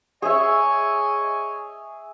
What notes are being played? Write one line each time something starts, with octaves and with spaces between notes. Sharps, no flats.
G#4 C#5 D#5 E5 G#5